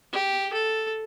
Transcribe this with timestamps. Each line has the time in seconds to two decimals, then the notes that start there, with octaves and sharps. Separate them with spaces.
0.13 G4
0.53 A4